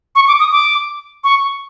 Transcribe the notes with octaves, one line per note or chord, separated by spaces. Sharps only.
C#6
D6
D#6
D6
C#6